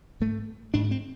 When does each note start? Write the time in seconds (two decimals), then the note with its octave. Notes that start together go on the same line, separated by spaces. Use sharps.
0.20 G#2 A3
0.74 G#2 D4
0.91 C4